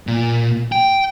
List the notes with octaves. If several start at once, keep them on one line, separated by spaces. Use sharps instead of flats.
A#2
G5